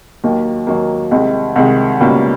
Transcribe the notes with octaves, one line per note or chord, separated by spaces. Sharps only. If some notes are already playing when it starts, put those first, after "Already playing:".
D#2 D#3 F#3 A#3
D#2 D#3 F#3 A#3
C2 C3 D#3 G#3
C2 C3 D#3 G#3
C#2 B2 G3 A#3 C#4